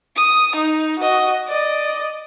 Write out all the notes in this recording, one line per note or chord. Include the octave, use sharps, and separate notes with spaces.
D#6
D#4
F#4 D#5
D5 D#5